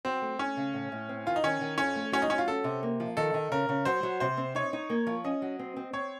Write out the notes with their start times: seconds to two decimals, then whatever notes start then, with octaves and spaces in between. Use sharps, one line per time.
0.05 F#3 C4
0.22 A3
0.39 A3 C#4
0.57 C#3
0.74 A2
0.92 A2
1.09 C4
1.26 D#3 F4
1.36 D#4
1.43 D#3 C#4
1.61 D#3
1.78 F2 C#4
1.95 A3
2.12 F#3 C#4
2.22 D#4
2.30 F#3 C#4
2.38 F4
2.48 C#4 A4
2.64 C3
2.83 A#3
3.00 F3
3.17 D#3 A4
3.34 D#3
3.51 C#3 A#4
3.69 C#3
3.85 F#3 C5
4.03 F#3
4.20 C3 C5
4.37 C4
4.55 D#4 C#5
4.73 D#4
4.90 A#3
5.07 F3
5.24 C#4 D#5
5.42 F#3
5.59 C4
5.76 C4
5.93 C4 C#5